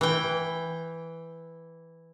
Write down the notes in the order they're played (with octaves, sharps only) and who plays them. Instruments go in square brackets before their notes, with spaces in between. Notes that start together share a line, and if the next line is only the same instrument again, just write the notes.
[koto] E3 G5